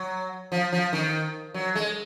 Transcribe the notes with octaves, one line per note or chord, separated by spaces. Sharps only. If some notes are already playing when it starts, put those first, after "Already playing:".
Already playing: F#3
F3
F3
D#3
F#3
G#3